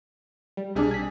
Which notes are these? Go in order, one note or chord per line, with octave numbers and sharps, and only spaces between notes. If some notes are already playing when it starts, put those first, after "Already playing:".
G3
B1 C3 G3 D4 G#4
G#6 B6